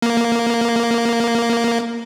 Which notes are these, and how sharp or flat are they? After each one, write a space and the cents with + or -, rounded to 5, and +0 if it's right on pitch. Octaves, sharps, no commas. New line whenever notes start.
A#3 +0